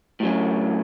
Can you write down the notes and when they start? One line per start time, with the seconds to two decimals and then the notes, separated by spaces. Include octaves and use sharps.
0.20 A2 F#3 C#4